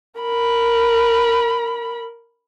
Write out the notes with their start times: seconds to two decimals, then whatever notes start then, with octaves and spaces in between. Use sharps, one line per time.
0.20 A#4 B5